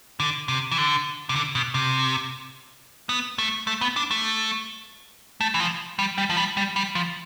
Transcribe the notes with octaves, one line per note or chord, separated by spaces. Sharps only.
D3
C3
E3
D3
C3
D3
B2
C3
B3
A3
A3
B3
D4
A3
A3
E3
F3
G3
G3
F3
G3
G3
G3
F3